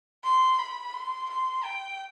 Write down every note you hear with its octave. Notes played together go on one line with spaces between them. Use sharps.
C6
B5
C6
C6
G5